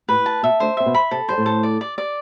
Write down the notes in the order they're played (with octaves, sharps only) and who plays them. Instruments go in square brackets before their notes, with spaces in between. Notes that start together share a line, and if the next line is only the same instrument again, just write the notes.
[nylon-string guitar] A2 [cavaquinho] B4
[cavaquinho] A5
[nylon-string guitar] B2 [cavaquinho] E5
[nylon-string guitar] D2 D3 [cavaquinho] C5
[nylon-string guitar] C4 [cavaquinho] E5
[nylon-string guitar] B2 B3
[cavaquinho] B5
[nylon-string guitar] C3 C4 [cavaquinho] A4
[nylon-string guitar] G3 [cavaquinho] C5
[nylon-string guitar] A2 A3
[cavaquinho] A4
D5
D5
D5